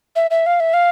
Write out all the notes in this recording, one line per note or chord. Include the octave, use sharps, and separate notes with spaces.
E5
E5
F5
E5
F5